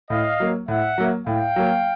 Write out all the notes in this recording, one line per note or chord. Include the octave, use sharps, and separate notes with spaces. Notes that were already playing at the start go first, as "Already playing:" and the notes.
A2 D#5 F5
F#3 A#3
A2 E5 F#5
F#3 A#3
A2 F5 G5
F#3 A#3